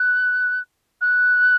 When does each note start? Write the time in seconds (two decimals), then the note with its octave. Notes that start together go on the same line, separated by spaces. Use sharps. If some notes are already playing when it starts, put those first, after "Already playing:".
Already playing: F#6
1.01 F#6